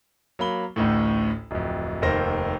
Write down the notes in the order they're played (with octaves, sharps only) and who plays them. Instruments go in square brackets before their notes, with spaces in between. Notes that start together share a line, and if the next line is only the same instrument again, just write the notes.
[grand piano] F#3 A#3 B5 G7
A1 D2 A2
D1 F2
F1 D#2 A#4 C5 A#6